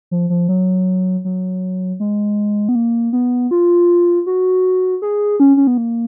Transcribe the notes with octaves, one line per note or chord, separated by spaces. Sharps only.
F3
F3
F#3
F#3
G#3
B3
A#3
B3
F4
F#4
G#4
C#4
C#4
B3
A#3